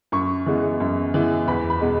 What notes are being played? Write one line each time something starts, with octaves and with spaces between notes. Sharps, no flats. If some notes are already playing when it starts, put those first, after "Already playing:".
F#2 C#6
E3 G#3 B3
F#2
E3 G#3 B3
E2 B5
B5
B2 G#3 B3